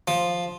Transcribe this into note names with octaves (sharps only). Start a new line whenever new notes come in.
F3